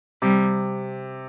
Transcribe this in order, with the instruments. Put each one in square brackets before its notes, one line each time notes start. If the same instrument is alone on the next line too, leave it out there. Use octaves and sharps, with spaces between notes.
[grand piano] C3 [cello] G3